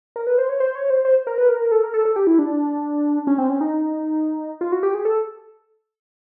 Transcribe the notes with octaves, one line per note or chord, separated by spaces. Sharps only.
A#4
B4
C5
C#5
C5
C#5
C5
C5
A#4
B4
A#4
A4
A#4
A4
A4
G4
E4
D4
C#4
C4
C#4
D#4
F4
F#4
G4
G#4
A4